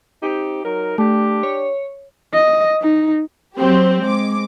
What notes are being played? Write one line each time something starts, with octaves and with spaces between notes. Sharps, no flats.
C4 D#4 G4
F#3 D#4 A#4
A3 D4 G4
C#5
D#5
D#4
F#3 C4 G4
G#3 D6